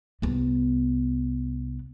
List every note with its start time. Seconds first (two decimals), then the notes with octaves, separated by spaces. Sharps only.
0.22 C2 B3